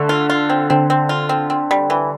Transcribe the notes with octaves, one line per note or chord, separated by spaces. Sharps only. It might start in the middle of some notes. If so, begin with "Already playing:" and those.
Already playing: D3 A3
F4
F4
C4
D3 C4
C4
F4
C4
C4
G3
E3